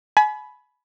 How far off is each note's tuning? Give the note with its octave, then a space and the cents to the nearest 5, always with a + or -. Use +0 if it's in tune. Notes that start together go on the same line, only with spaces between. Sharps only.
G#5 +40 B5 +0